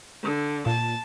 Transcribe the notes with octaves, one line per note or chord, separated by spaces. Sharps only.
D3
A#2 A5